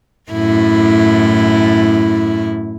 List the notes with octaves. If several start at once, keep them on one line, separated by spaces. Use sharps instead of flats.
F#2 A2 E4